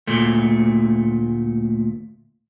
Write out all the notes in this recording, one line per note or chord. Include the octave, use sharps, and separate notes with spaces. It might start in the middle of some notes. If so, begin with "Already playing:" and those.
D2 A#2 A3